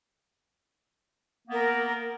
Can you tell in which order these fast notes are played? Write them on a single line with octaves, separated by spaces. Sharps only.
A#3 B3 A#4